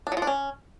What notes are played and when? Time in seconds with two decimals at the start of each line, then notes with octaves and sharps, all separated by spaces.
0.07 D4
0.12 F#3
0.17 F3
0.22 D4
0.27 C#4